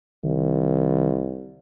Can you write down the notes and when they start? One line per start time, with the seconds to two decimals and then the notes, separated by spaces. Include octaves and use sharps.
0.24 C2 D#3